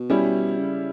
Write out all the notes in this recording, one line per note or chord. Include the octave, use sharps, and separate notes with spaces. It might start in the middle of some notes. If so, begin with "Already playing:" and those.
Already playing: B2
G3 C#4 E4 G4
C#3